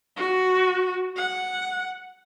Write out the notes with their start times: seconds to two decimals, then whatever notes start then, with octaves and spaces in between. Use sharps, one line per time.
0.17 F#4
1.16 F#5